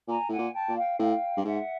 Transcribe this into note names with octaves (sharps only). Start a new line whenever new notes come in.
A#2 G#5 A#5
A2 F#5 G#5
A#2
G5 A5
A#2
F5 G5
A2 F5 G5
G2
G#2 E5 F#5